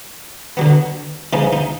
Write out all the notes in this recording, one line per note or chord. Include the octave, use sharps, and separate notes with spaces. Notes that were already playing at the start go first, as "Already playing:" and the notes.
D3 F#3 B3
C#3 F3 G#3 B3 D#4
D#4